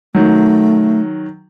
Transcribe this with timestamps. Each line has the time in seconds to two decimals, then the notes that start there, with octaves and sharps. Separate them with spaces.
0.15 D#3 F#3 A3